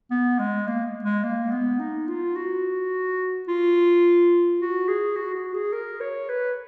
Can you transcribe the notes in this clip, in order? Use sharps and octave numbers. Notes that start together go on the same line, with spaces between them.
B3
G#3
A#3
G#3
A#3
B3
D#4
F4
F#4
F4
F#4
G#4
F#4
F#4
G#4
A#4
C#5
B4